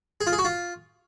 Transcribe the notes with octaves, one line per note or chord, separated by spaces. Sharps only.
G#4
F4
G#4
F#4
F4